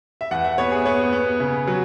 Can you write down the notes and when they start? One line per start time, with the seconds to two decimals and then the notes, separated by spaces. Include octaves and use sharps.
0.21 E5
0.31 E2 F#5
0.45 E5
0.58 B3 C#5
0.72 G#4
0.85 B3 C#5
1.12 B3
1.40 C#3
1.67 F#3